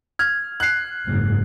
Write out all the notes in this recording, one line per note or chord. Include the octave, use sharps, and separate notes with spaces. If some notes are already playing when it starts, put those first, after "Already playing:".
F6 G#6
F#6 C7
F#1 G#2